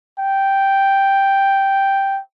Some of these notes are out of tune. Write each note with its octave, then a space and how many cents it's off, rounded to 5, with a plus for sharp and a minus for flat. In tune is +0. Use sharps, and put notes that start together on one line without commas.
G5 +0